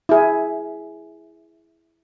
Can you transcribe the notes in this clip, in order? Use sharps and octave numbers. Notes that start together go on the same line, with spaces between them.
E4 G#4